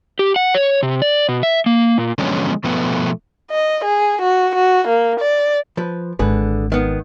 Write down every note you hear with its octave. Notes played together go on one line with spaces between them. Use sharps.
G4
F#5
C#5
C3
D5
B2
E5
A#3
A#2
D3 F3 F#3 G#3 B3 C#4
B2 F3 A3 B3
D#5
G#4
F#4
F#4
A#3
D5
F3 B4
G#1 D3 G#4 B4
D#3 B3